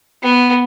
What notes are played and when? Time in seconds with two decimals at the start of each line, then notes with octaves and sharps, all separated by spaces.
0.23 B3